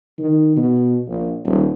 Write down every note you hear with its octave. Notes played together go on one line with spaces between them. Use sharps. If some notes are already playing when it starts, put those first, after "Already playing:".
D#3
B2
A#1
D#1